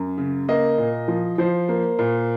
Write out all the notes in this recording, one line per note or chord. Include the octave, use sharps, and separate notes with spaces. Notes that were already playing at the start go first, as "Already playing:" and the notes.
Already playing: F#2
C#3
A#3 D#5
A#2
F3
F3 C5
A#3
A#2